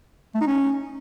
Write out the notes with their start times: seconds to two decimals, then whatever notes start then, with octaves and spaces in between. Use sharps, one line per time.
0.35 A3
0.41 D#4
0.47 C#4